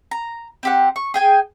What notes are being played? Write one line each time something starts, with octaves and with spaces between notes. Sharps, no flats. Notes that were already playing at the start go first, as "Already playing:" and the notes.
A#5
C4 G4 F#5
C#6
G#4 G5 G#5